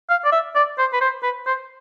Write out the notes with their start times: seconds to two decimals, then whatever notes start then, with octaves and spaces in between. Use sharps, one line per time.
0.09 F5
0.25 D5
0.32 E5
0.55 D5
0.78 C5
0.93 B4
1.01 C5
1.23 B4
1.46 C5